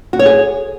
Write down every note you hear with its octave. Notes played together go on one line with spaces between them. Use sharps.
F#4
C#5
G#4